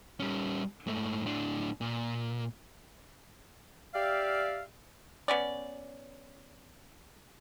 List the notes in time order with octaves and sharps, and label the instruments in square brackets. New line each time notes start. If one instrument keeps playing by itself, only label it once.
[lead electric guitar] G3 C#4
G#2 A3
A2 D4
A#2
[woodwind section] G4 D5 E5 F5
[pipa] B3 C#4 D5